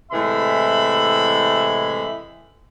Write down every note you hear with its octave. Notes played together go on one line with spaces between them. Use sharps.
A2 C3 E3 G#3 E5 B5